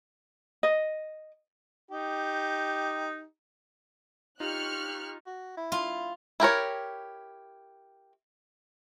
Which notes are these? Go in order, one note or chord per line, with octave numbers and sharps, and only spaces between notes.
D#5
D#4 G4
D#4 F4 G4 C#6 F6 F#6
F#4
E4
F4
E4 G4 A#4 C#5